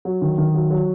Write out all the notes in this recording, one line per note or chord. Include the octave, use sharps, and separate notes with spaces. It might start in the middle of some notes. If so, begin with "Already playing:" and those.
F#3
D#3
D#3
F#3
F#3